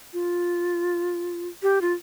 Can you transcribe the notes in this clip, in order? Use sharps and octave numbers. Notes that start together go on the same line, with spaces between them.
F4
G4
F4